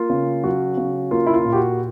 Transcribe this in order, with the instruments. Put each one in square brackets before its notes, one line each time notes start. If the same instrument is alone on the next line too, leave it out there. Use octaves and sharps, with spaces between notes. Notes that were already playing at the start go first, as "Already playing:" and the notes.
Already playing: [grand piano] A#3 F4
C#3
F#3 F#4
C#3
A#3 F4
E4
F4
A#2
G4
F#4